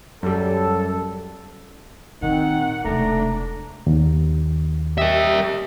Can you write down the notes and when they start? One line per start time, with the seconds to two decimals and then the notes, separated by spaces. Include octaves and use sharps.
0.23 F#2 G3 A4
2.22 A#2 D#3 C4 F#5
2.85 E1 C3 A3 D4 A#5
3.87 D#2
4.98 G4 A#4 D#5 E5